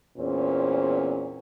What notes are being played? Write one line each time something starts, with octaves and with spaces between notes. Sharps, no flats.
E2 A#2 C4 C#4